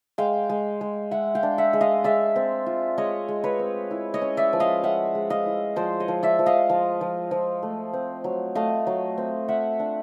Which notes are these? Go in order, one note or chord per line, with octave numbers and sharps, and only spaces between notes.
G#3 F5 G5
G#3
G#3
G#3 E5 F#5
F5 G5
D4
E5 F#5
G#3
D#5 F5
G#3 D5 E5
C4
F4
G#3 C#5 D#5
G#3
B4 C#5
C4
E4
C#5 D#5
C#4
D5 E5
F3
D#5 F5
C#4 E5 F#5
G#3
D#5 F5
E4
F3 C5 D5
C#5 D#5
F3
D5 E5
F3
D#5 F5
F3
F3
F3
A3
C4
F#3
A3 D#5 F5
F#3
C4
F4 E5 F#5
D4